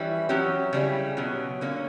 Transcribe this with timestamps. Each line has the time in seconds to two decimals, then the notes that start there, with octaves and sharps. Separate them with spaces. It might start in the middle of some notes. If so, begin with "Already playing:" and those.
Already playing: E3 G3 C#4 E4
0.29 F#3 C#4 G4
0.73 C#3 G3 C#4 E4 G4
1.17 B2 F#3 C#4
1.61 D3 A#3 C#4